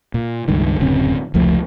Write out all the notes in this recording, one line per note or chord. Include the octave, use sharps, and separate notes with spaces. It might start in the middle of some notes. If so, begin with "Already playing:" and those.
A#2
C#2 G2 D#3
D1 F#2 C#3 C4
F1 C#2 F3 A3